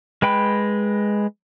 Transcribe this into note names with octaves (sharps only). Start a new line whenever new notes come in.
G#3 B4 G5 B5